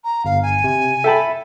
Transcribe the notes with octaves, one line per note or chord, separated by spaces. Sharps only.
A#5
G1 F5
G#5
C3
A4 E5 G5 A5 B5